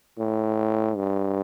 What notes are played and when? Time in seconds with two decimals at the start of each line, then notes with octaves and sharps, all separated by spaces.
0.19 A2
0.97 G2